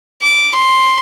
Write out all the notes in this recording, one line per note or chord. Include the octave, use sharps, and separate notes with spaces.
D6
C6